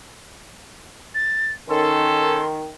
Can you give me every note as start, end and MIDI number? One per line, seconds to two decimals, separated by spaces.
1.15 1.52 93
1.69 2.71 51
1.69 2.41 61
1.69 2.41 69
1.69 2.47 84